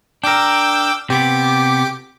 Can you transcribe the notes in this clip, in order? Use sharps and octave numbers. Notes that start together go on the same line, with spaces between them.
D4 A#4 G5 D6 E6
C3 B3 G4 D6